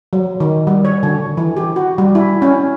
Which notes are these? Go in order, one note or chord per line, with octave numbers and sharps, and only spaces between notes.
F#3
D#3
G3
C#5
D3
E3
G4
F#4
G3
E4
C#4